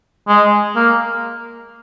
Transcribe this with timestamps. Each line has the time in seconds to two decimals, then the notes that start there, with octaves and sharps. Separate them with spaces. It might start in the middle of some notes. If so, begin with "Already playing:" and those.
0.28 G#3
0.76 A#3